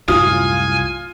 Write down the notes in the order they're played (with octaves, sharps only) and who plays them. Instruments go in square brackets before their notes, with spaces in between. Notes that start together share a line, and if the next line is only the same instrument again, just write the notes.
[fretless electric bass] C2 F#2 A2 [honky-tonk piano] F4 [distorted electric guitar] G#5 [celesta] D#6